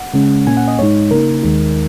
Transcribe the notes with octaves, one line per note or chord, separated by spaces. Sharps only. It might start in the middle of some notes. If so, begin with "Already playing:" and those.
Already playing: F#5
C#3 G#3 C#4
A#2 A#3 C#4 G#5
F#5
D#5
G#2 G#3 D#4 C#5
C#3 A#3 D#4 A#4
D#2 D#3 G#3 D#4